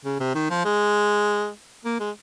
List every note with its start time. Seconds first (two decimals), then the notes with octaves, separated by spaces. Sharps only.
0.05 C#3
0.20 C3
0.35 D#3
0.50 F3
0.65 G#3
1.85 A#3
2.00 G#3